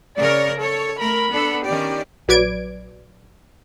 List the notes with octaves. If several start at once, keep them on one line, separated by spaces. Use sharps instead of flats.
C#3 A#4 C#5 D5
A4 C#5
A3 A#4 B5
B3 D4 A4
D#3 C#4 G4 D5
A#1 F#3 B4 D5 G#6 D7